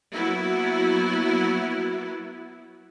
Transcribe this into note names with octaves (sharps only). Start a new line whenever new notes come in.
F#3 A#3 B3 E4 F#4